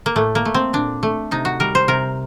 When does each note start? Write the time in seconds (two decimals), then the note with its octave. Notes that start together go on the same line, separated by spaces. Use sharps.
0.06 A#3
0.16 A2 A3
0.35 A#3
0.45 A3
0.54 C4
0.73 A#2 D4
1.03 A3
1.31 C3 D#4
1.45 F#4
1.60 G3 A#4
1.75 C5
1.88 C3 A#4